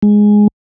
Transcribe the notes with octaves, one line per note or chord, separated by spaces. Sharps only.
G#3